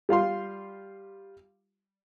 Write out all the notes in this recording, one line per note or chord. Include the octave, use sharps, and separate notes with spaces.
G3 F4 F5 C6